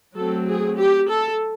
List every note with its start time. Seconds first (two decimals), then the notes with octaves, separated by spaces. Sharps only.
0.16 F#3 A3 C4 A4
0.47 G#4
0.78 G4
1.09 A4